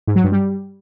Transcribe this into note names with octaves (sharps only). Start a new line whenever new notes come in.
G#2
F#3
G2
G3